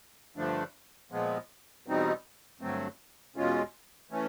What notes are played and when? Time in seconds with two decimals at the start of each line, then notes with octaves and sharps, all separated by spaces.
0.37 G2 D3 F3 A3 D4
1.12 A#2 F3 G#3 B3
1.86 E2 B2 G3 C4 D#4
2.61 G2 D3 F#3 A3 C4
3.36 E2 B2 G#3 C#4 F4
4.11 E3 A3 C#4